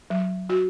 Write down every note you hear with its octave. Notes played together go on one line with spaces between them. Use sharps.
F#3
F#4